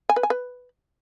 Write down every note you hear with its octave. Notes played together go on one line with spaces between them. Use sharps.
G#5
B4
G#5
B4